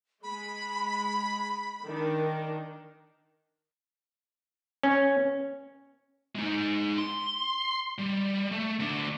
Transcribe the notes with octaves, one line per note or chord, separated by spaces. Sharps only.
G#3 B5
D#3 D4 A#4
C#4
G#3 D#4
C6
G3
A3
D2 D4